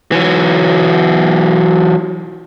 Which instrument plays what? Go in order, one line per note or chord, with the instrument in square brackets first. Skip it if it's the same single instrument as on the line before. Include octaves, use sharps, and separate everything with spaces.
[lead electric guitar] E3 F#3